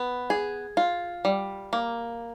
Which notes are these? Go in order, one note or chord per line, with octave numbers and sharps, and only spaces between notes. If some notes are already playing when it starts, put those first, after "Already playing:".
Already playing: B3
G#4
F4
G3
A#3